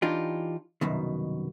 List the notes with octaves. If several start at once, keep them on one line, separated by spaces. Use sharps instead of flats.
E3 D4 D#4 F4 G4
C2 F#2 B2 D#3